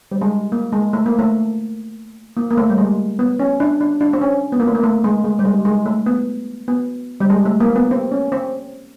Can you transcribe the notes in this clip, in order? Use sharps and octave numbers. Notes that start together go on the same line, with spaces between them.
G3
G#3
A#3
G#3
A3
A#3
A3
A#3
A#3
A3
G3
G#3
B3
C#4
D4
D4
D4
C4
C#4
B3
A#3
A3
A#3
A3
G#3
G#3
G3
G#3
G#3
A3
B3
B3
G3
G#3
A3
A#3
B3
C4
C#4
C4